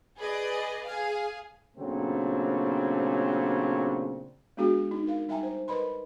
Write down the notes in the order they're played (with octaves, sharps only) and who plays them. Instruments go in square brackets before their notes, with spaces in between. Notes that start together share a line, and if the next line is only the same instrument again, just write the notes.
[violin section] G#4 B4 D5 D#5
G#4 F5
[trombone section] A#2 C#3 F#3 A3 C4 D4
[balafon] G#3 B3 D4 F#4 G#4
D#4
D#4 A#4 F5
G3 D#4 E5 G5 G#5 A#5
C5
A#4 B4 D#5 B5 C6